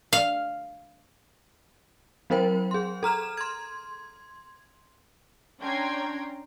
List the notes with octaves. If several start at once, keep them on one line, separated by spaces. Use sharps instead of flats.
F5
F#3 C4 A#4 C5 G5
G#4 C6
A4 A#5 F6 E7
C6 G#6
C#4 D4 G5 A#5 C6 G#6